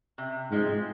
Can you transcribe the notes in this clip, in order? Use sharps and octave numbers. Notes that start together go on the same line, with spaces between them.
C3
G#2 F3 G#3 C4